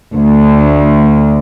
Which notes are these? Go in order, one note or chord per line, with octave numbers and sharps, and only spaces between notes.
D2